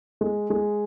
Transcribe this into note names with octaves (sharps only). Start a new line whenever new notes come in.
G#3
G#3